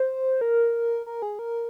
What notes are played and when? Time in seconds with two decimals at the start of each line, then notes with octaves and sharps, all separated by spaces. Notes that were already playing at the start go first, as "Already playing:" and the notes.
Already playing: C5
0.41 A#4
1.06 A#4
1.22 G#4
1.39 A#4